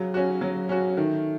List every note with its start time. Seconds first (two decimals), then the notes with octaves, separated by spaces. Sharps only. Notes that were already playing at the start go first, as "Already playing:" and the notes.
Already playing: C#3 F#3
0.14 C#4 F#4
0.41 F#3
0.69 C#4 F#4
0.97 D#3 A3